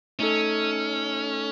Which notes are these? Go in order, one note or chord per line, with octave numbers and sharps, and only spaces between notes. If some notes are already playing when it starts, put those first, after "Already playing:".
A3 C#4 D#4 A4